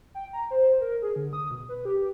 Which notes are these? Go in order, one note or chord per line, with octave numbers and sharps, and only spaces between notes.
G5
A#5
C5
A#4
G#4
D3
D#6
B2
B4
G4